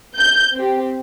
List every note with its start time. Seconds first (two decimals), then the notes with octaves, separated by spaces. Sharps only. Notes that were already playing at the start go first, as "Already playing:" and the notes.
0.18 G6
0.55 C4 G4